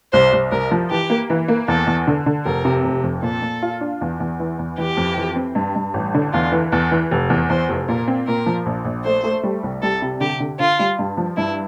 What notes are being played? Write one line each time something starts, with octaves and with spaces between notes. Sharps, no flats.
C2 C5
C2
C2 A#4
F3
E3 G4
A#3
E3
A#3
E2 A4
E2
D3
D3
F1 A#4
C3
F1
F2
A#2 A4
A#2
F4
D4
E2
E2
E3
E2
E3 G4
F2
E3
C4
G2
G2
A1
D3
E2 F4
E3
E2 A4
E3
F1
E2
E2 C5
F1
A#2 A#4
C4
A#2 A#4
F3
A#1
A#1
A3 C5
A3
G3
C2
G3 A4
C3
D3 G4
D3
D3 F4
G3
G2
F3
G2 E4